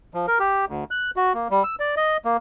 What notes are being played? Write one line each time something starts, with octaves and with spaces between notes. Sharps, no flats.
F3
A#4
G4
D2
F#6
F#4
A#3
G3
E6
D5
D#5
A#3